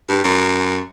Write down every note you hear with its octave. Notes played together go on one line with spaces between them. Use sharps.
G2
F#2